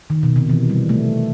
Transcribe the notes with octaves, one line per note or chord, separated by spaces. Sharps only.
D#3
B2
C3
E3
G3
A3